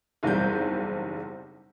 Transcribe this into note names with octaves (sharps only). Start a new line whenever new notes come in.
F#1 B1 E2 G3 C4 G6